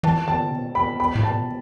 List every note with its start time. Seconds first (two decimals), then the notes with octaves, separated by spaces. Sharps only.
0.03 E3 A5
0.27 D3 A5
0.51 B2
0.75 B5
1.00 B5
1.15 A2
1.23 A5
1.31 B2